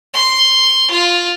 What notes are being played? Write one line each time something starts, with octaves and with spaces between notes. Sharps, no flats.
C6
F4